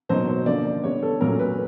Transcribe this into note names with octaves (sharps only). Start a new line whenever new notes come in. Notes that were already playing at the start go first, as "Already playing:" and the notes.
B2 F#3 A#3 D#4 C5
C5
D3 F3 A#3 D5
D5
D3 G3 B3 C#5
A4
A#2 F#3 A3 C#4 A#4
B4